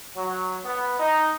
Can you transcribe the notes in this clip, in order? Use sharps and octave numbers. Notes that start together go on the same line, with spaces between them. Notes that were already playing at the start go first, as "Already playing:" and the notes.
F#3
B3
D#4